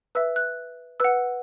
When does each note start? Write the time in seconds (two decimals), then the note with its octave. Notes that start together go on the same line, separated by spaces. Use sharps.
0.15 B4 E5 E6
0.36 F#6
1.00 B4 F#5 E6